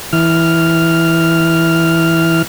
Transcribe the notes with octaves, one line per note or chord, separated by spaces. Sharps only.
E3 F6